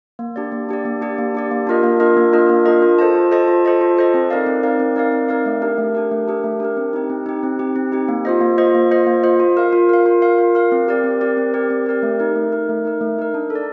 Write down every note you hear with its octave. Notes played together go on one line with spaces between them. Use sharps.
A#3
D4 G4 D5
A#3
D4 G4 D5
A#3
D4 G4 D5
A#3
D4 G4 D5
A#3
D4 F4 A#4 D#5
A#3
D4 F4 A#4 D#5
A#3
D4 F4 A#4 D#5
A#3
D4 F4 A#4 D#5
F4
A4 C5 D#5 A5
F4
A4 C5 D#5 A5
F4
A4 C5 D#5 A5
F4
A4 C5 D#5 A5
C4
D#4 A#4 D5 F5
C4
D#4 A#4 D5 F5
C4
D#4 A#4 D5 F5
C4
D#4 A#4 D5 F5
A3
D4 G4 A#4
A3
D4 G4 A#4
A3
D4 G4 A#4
A3
D4 G4 A#4
C4
D#4 G4
C4
D#4 G4
C4
D#4 G4
C4
D#4 G4
A#3
F4 C5 D#5
A#3
F4 C5 D#5
A#3
F4 C5 D#5
A#3
F4 C5 D#5
F4
A#4 F5
F4
A#4 F5
F4
A#4 F5
F4
A#4 F5
C4
G4 A#4 D5
C4
G4 A#4 D5
C4
G4 A#4 D5
C4
G4 A#4 D5
A3
D#4 A#4
A3
D#4 A#4
A3
D#4 A#4
A3
D#4 A#4
D4
A4
D5